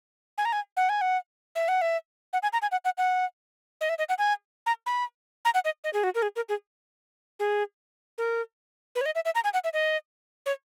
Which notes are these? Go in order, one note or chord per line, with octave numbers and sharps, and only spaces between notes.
G#5
A#5
G#5
F#5
G#5
F#5
E5
F#5
E5
F#5
G#5
A#5
G#5
F#5
F#5
F#5
D#5
E5
D#5
F#5
G#5
A#5
B5
A#5
F#5
D#5
D#5
G#4
F#4
A#4
G#4
A#4
G#4
G#4
A#4
B4
C#5
D#5
E5
E5
A#5
G#5
F#5
E5
D#5
C#5